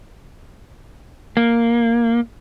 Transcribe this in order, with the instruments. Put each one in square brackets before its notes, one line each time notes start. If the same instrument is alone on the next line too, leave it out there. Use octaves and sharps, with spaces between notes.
[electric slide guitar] A#3